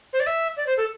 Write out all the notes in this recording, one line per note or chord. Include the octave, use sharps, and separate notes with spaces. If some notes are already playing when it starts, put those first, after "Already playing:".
C5
D5
E5
D5
C5
A4